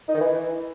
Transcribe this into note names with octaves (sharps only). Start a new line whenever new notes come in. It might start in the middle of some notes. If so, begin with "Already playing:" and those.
D#4
D#3
E3